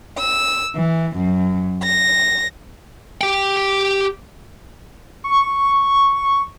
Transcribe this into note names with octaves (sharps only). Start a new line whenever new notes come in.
E6
E3
F#2
A#6
G4 G5
C#6